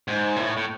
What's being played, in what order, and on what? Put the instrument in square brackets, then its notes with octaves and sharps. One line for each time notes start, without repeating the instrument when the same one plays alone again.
[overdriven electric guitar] G#2
A2
A2